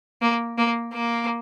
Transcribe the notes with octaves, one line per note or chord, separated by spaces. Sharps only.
A#3
A#3
A#3